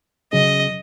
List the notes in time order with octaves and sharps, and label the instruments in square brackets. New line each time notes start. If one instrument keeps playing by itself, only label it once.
[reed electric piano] C#3 F#3 C#4 G#4 [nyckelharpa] D#5